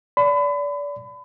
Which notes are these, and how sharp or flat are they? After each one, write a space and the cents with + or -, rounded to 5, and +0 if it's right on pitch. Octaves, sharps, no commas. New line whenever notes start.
D5 -25 B5 +30